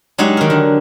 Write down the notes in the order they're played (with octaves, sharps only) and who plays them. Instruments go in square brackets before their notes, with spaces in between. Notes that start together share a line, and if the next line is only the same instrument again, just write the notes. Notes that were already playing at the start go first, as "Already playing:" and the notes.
[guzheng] F#3 G#3 D#4 F#4 G4
D#3 A#4
D3